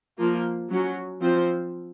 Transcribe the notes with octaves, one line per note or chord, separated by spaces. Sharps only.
F3 A#3 F4
F#3 C#4 F#4
F3 C4 F4 C5